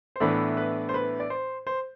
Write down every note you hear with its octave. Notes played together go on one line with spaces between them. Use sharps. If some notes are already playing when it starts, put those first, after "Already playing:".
C5
A2 E3 B3 D4 B4
B4
C5
B4
D5
C5
C5